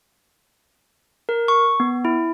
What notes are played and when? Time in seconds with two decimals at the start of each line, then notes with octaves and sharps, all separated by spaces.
1.29 A#4
1.48 C#6
1.80 B3
2.05 E4